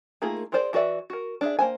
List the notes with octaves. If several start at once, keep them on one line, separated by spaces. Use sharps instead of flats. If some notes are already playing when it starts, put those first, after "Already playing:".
A3 A#3 D#4 F4 G#4
F4 G#4 A#4 C5 D5
E3 F#4 B4 D5 E5
F#4 A#4
D4 G#4 E5
A#3 C5 G#5